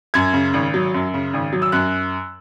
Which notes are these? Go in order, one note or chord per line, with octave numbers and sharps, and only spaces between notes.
F#2 G#6
C#3
G#1
F#3
F#2
C#3
G#1
F#3
E6
F#2 F#6